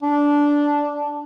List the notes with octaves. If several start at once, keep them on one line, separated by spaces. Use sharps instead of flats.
D4